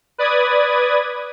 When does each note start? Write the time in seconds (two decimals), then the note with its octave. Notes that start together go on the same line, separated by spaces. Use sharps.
0.18 B4 D5 D#6 G#6